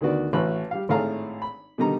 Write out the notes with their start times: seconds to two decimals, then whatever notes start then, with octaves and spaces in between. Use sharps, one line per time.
0.01 D2 D#3 B3 F#4 D5
0.33 A1 E3 F#4 B4 B5 F#6
0.71 G3 G4 F5
0.89 G#1 A2 A3 G#4 F5 A#5
1.42 B5
1.78 B2 D3 D#3 G3 D#4 A#5